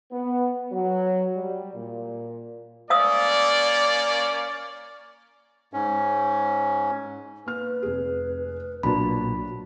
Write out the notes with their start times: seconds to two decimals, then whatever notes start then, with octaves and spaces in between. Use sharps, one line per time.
0.12 B3
0.72 F#3
1.36 G3
1.75 A#2
2.90 A#3 C#4 D5 F5 D#6 E6
5.73 G#2 C#4
7.46 A#3 B4 F6
7.82 F1 G#4
8.83 B1 A#2 D4 F#4 A5 B5